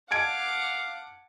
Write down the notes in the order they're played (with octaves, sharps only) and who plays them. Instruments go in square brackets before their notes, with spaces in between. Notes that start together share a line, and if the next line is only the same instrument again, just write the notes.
[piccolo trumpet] F5 [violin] F#5 D6 [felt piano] A5 G#6 D7